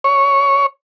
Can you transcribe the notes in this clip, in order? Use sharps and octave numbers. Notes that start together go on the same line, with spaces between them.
C#5